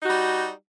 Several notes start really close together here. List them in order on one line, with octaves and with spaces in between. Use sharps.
D#4 F#4 G3